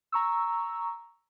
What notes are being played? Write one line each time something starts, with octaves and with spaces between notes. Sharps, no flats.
A#5 C#6 E6